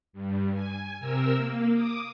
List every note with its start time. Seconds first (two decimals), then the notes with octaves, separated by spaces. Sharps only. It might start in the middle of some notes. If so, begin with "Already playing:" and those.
0.13 G2
0.53 G#5
1.00 C3 A#4 E6
1.36 A#3
1.73 D6 D#6